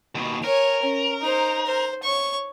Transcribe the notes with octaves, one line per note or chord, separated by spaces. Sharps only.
D#2 B2
A#4 C#5 G#5
C#4
D#4 C5
C5
C#5 C#6